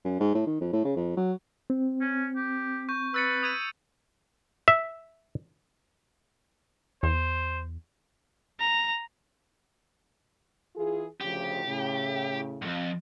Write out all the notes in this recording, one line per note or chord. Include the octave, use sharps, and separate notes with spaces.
F#2
G#2
A2
D#3
F2
A2
C#3
F2
F#3
C4
C#4
G4
C#6 G6
B4 E6 A6 C#7
D#6 G#6 D#7
E5
E2 C5
A#5
E3 F4 G#4
D2 C#3 F3 G4
A2 C#3
B1 F2